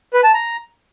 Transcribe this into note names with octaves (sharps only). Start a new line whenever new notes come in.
B4
A5
A#5